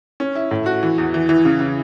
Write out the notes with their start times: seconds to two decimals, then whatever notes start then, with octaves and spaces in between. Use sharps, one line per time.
0.20 C#4
0.35 E4
0.51 A2
0.66 F#4
0.83 E3
0.98 E2
1.14 E3
1.29 E3
1.45 C#3
1.60 C#3